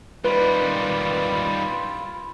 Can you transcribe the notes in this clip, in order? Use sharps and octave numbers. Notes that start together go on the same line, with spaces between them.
D#3 G3 E4 F4 B4